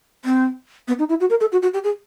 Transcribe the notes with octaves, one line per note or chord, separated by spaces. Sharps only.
C4
B3
D#4
E4
F#4
A#4
A4
F#4
F#4
G4
G#4